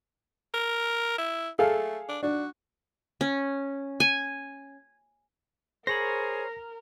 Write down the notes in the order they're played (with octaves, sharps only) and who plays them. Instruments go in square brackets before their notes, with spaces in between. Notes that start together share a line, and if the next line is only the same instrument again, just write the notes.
[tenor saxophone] A#4
E4
[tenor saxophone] A3 [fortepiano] G#4 A4 F5
[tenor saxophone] D4
[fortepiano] D4 [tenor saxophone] F#4
[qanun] C#4
G#5
[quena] G#4 [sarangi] A#4 [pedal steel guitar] C5 C#5 B5 [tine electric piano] A#6